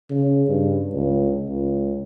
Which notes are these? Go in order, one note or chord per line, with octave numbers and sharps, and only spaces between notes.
C#3
G2
C#2
C#2